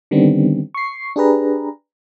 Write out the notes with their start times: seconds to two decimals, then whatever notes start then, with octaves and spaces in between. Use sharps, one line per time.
0.11 D3 D#3 G3 B3 C4 D4
0.74 C#6 C7
1.16 D4 G4 G#4 B4 A#5